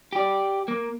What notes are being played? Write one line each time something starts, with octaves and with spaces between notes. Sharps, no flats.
G4 D5
A#3